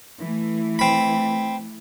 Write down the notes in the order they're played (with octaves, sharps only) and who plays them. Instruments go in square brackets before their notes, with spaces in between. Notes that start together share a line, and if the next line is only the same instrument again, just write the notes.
[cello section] E3 A3
[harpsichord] C4 B5